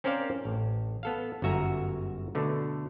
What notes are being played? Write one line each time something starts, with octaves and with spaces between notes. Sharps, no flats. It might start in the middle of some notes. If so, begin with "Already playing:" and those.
C4 C#4 A#4 C5 D5 F5
A1
B3 A4 F5
G1 F#2 F#4 E5 G#5 A#5
B2 D3 A3